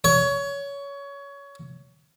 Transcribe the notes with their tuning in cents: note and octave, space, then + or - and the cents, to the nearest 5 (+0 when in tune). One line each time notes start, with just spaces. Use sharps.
C#5 +20